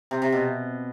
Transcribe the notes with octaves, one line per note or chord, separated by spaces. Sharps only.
C3
C3
B2